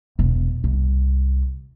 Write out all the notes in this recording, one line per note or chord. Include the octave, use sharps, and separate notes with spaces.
E1
C2